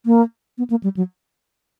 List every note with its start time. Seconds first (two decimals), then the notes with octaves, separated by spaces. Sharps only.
0.06 A#3
0.58 B3
0.70 A#3
0.83 G3
0.97 F#3